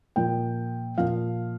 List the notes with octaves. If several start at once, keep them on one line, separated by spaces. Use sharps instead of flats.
A#2 F3 G5
A#2 F3 F5